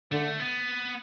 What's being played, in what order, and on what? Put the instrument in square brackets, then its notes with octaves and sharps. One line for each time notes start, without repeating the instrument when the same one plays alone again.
[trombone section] D3 [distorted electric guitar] A3
[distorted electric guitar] B3